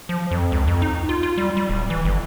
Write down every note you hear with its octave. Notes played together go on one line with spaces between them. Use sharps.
F3
F2
C#2
F2
D#4
F4
F4
G3
G3
D1
E3
G1